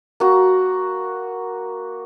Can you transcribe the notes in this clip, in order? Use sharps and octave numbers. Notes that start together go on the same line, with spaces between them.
A#3 F#4